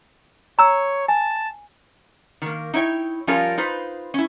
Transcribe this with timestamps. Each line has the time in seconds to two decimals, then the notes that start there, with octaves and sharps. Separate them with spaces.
0.59 C#5 A#5 E6
1.08 G#5 A5
2.42 D#3 A#3
2.73 D#4 E4 C#5 G5
3.27 F3 G3 C#4 F4 A4 A#4
3.57 D#4 F4 B4 C5
4.14 C#4 E4